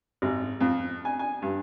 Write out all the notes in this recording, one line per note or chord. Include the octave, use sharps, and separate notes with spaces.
G#1
F2
G#5
G#5
G2